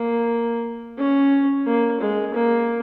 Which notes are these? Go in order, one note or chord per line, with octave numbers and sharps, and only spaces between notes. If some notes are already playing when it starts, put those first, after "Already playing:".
Already playing: A#3
C#4
A#3
G#3
A#3